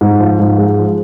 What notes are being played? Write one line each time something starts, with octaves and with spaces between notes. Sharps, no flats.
G#2
F3
G#2
G#3
F3